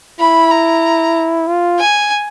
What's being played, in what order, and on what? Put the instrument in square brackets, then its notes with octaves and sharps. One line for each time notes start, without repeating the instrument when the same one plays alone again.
[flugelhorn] E4 [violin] B5
[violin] A#5
[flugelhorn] F4
[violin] G#5